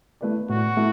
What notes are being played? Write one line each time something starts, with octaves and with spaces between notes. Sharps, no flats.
A3 E4 B4 D5
A2 F#4
A3 E4